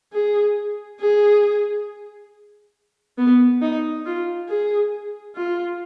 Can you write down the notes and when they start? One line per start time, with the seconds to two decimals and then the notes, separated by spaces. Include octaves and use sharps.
0.13 G#4
1.00 G#4
3.18 B3
3.61 D#4
4.05 F4
4.48 G#4
5.36 F4